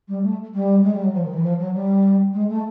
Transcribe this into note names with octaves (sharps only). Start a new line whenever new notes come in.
G3
A3
G3
G#3
G3
F#3
F3
D#3
E3
F3
F#3
G3
G#3
A3